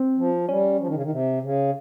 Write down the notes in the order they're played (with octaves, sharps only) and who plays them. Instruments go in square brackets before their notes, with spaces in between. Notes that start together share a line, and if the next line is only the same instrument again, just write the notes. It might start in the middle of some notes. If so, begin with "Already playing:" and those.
Already playing: [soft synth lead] C4
[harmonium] F3
[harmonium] G3 [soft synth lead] C#4
[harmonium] F3
D#3
C#3
D#3
C3
C#3